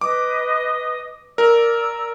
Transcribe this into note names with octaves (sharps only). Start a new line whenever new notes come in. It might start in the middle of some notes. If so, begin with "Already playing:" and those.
B4 D#5 D6 D#6
A#4 D5 E6